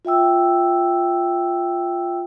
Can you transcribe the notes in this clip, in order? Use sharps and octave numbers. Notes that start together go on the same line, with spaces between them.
F4 E5 G5 E6